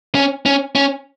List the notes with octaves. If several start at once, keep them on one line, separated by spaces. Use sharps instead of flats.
C#4
C#4
C#4